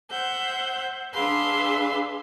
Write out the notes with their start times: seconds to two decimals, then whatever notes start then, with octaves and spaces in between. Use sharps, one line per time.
0.10 C5 E5 F#5 G6
1.13 D4 G#4 B4 E5 F5 C6